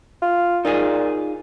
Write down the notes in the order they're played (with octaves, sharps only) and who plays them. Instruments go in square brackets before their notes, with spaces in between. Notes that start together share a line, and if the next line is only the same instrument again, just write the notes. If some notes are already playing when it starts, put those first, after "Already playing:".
[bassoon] F4
[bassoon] A#2 [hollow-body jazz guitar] D#4 F4 G#4